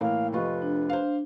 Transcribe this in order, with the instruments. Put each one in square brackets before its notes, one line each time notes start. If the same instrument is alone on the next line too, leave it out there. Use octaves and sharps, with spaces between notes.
[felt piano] A2 E3 A#3 [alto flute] F5 [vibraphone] G5
[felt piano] F1 F4 [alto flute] B4 [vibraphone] D#5 C#6
[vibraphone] D4
[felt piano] C5 F5